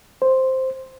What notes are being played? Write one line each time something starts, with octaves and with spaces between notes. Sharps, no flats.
C5